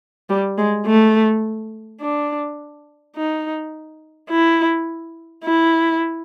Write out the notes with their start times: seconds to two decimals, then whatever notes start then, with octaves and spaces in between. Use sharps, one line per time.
0.29 G3
0.58 G#3
0.86 A3
2.01 D4
3.16 D#4
4.30 E4
5.44 E4